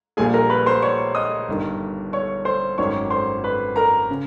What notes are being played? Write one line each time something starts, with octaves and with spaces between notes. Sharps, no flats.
A#1 A#2 G3 G#4 G#5
A#4 A#5
B4 B5
C5 C6
C#5 C#6
D#5 D#6
G1 G2 D#3
C#5 C#6
C5 C6
G#1 F#2 D#3 C#5 C#6
C5 C6
B4 B5
A#4 A#5
C#3